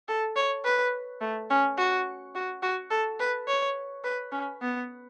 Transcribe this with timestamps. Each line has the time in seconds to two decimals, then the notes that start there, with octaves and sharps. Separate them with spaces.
0.09 A4
0.36 C#5
0.65 B4
1.21 A3
1.50 C#4
1.78 F#4
2.35 F#4
2.63 F#4
2.91 A4
3.20 B4
3.48 C#5
4.04 B4
4.32 C#4
4.62 B3